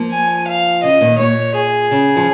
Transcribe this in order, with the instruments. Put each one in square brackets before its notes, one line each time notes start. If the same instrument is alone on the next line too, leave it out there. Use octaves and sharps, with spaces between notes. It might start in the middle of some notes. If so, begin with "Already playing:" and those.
Already playing: [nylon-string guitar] F3 A#3
[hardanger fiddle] G#5
F5
[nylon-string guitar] C#3 [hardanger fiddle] D#5
[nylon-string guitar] A#2 D#3
[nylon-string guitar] A#2 [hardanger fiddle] C#5
[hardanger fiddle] G#4
[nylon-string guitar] C#3
F3